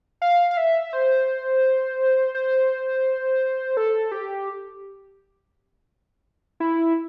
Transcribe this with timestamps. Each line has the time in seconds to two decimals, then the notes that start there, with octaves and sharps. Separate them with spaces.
0.22 F5
0.51 F5
0.57 E5
0.93 C5
2.35 C5
3.77 A4
4.12 G4
6.60 E4